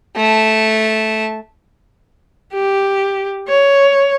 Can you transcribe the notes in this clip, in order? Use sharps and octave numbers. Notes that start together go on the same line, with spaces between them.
A3 A5
G4
C#5